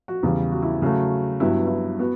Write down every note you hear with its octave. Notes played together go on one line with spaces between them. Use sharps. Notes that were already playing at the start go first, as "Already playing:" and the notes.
F#4
E2 C#3 G3
F#4
E4
C#3 F#3 A3 F#4
G2 F#3 B3 E4
E4
B3 F#4